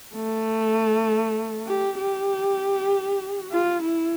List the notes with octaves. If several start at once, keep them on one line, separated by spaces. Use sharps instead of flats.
A3
G4
G4
F4
E4